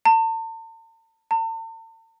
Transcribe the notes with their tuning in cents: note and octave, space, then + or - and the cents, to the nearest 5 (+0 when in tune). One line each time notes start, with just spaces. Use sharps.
A5 +40
A5 +45